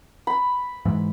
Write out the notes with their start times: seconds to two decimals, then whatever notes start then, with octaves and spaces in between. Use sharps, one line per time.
0.27 B5
0.85 G#2 E3